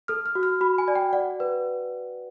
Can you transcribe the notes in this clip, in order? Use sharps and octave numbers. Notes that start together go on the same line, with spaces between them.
A4 F6
F6
F#4
F6
F#4 B5
G#5
D5
G5
D5 F#5
B4